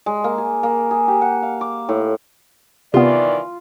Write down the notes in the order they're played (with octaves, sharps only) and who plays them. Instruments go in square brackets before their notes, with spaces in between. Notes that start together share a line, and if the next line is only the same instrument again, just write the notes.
[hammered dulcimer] G#3
A#3
G#4
A#3
G#4
G4
F#5
F5
D6
A2
[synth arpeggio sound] C3 B3 [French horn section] D#3 E3 D5 [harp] F4